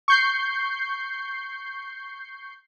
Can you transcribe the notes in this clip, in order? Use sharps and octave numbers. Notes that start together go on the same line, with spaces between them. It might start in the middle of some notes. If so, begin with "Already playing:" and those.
C#6 G6 C7